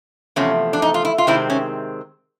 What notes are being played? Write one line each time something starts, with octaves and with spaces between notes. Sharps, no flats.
E2 C3 F3 A3 C#4
D4
D#4
F4
E4
F4
C3 D#3 G#3 C4 E4
C#4